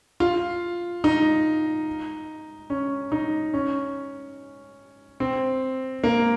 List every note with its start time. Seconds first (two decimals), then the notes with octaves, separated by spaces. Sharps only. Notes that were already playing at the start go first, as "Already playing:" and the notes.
0.20 F4
1.04 D#4
2.70 C#4
3.12 D#4
3.54 C#4
5.20 C4
6.04 A#3